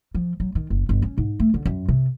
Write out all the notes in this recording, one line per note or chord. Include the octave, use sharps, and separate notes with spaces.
F3
F#3
D#3
F#1
G1
C#4
G#2
A3
D3
F#2
C3